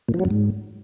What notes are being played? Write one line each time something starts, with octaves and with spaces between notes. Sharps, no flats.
A#2
F3
F#3
F#2
G#2